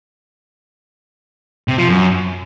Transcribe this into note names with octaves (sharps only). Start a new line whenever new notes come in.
C3
F3
F#2